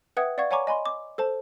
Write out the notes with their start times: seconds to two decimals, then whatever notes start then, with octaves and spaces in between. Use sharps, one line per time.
0.17 B4 E5 F#5 G5 D#6 G#6
0.38 D5 F5 F#5 C#6 G#6
0.51 C#5 F#5 G#5 A#5 C#6 D6
0.67 D#5 G#5 B5 C6
0.86 D6
1.18 A4 C5 A5